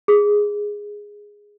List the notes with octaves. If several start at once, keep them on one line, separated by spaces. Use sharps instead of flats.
G#4